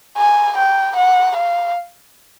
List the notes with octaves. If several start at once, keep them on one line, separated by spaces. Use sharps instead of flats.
G#5
G5
F#5
F5